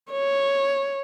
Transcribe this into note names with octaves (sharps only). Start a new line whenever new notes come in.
C#5